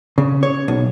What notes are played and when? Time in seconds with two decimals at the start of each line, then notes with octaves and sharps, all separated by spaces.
0.18 C#3
0.43 C#5
0.68 B1